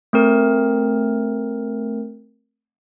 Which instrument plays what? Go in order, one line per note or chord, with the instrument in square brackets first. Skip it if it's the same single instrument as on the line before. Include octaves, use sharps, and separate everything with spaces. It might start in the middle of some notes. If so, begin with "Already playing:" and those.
[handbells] A3 C4 A#4